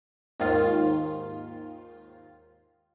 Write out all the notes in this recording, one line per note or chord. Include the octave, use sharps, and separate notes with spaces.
D#2 G#2 D#3 F4